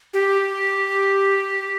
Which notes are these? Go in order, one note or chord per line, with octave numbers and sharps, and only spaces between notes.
G4